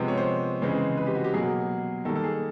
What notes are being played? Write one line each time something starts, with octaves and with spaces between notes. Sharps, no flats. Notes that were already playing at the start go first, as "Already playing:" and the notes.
Already playing: C3 F3 G#3 B3
C#5
C5
C#3 E3 G#3 C4
B4
G4
F#4
G4
B2 F#3 A#3 G#4
D#3 G3 A#3 A4
A4
G#4